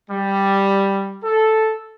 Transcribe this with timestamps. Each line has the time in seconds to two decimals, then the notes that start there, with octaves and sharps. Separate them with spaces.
0.10 G3
1.23 A4